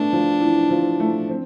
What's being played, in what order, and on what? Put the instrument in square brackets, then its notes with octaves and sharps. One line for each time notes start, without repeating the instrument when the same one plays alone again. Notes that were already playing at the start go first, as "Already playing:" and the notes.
Already playing: [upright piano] A3 B3 [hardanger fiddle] D4
[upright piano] F3
E3
F3
A3
C4